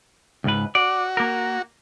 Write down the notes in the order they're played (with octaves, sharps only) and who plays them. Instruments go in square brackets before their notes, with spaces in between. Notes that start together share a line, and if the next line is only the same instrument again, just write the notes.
[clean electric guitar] C#2 G#2 B4
[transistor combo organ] F#4 [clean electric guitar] D5
[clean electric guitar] A#3 A#4